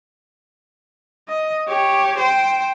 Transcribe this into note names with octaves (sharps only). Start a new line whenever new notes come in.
D#5
G4 C#5
C5 G5